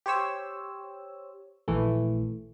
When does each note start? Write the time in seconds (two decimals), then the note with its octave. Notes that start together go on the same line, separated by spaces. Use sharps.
0.06 G4 C5 C#5 E6
1.68 A#1 E3 A3